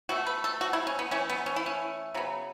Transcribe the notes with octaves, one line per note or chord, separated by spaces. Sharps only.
B2 A3 F#4
B4
A4
F#4
E4
C#4
B3
E3 A3 C#4
B3
C#4
E4
C#4
C#3 F#3 B3